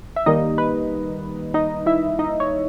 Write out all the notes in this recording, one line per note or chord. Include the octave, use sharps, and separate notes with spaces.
E5
D#3 G3 A#3 D#4 D#5
B4
D#4 D#5
E4 E5
D#4 D#5
C#5